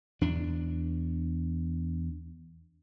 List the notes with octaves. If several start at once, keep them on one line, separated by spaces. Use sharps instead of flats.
E2 D4